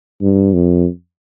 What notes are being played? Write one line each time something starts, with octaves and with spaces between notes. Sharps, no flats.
G2
F2